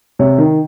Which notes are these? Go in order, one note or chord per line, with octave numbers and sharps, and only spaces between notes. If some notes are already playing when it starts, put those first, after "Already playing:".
C3 C#5
D#3